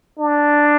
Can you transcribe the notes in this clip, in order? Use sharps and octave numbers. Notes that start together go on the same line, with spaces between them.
D4